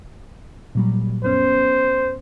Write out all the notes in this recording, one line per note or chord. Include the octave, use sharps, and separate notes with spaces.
A#2 F#3 G3
F#2 B3 C#4 C5